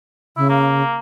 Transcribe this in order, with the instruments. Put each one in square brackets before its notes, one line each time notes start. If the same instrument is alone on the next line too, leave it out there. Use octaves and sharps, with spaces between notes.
[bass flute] C#3 [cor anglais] E4
[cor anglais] A#3